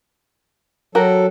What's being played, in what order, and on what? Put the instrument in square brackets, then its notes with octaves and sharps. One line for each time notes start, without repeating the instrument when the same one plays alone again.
[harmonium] F#3 A4 [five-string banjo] F#4 G4 A#4